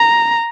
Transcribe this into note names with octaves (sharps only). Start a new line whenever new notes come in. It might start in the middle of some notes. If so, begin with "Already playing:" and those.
Already playing: A#5